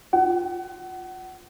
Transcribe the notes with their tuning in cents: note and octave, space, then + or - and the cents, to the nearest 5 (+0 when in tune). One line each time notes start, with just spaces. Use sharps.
F4 +10 F#5 +25